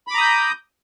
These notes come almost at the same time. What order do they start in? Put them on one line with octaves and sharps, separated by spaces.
B5 D6 A#5 D#6 G6